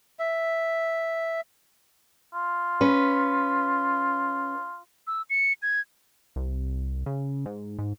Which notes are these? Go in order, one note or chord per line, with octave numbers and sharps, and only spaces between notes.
E5
F4
C#4 B4
E6
C#7
G#6
C2
C#3
G#2
G#2